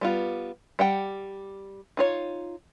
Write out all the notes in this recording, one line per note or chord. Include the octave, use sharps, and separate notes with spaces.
G3 B3 F4
G3 F#5 G5
D#4 F4 C#5